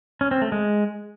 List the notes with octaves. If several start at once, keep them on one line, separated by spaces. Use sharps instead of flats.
C#4
C4
A3
G#3